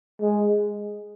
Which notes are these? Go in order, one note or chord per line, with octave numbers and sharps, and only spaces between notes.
G#3